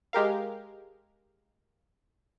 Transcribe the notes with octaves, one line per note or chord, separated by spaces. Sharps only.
G#3 G4 A#4 F5